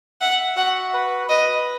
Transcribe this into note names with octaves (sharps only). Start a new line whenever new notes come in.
E5 F#5
F#4 F#5
B4
B4 D#5